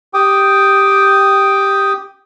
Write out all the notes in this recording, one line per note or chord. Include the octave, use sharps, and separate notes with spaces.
G4 G5 D6 D#6